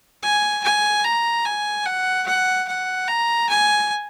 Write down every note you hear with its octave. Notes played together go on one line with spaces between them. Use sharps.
G#5
G#5
A#5
G#5
F#5
F#5
F#5
A#5
G#5